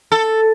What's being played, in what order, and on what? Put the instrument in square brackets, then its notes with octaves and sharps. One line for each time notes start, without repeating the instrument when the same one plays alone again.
[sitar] A4